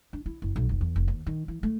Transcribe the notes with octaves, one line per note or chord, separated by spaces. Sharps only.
D4
E4
F#1
B1
F1
E2
F1
D#2
D#3
E3
A3